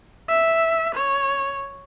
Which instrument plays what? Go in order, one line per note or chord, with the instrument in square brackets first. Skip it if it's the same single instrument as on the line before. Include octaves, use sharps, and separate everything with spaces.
[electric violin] E5
C#5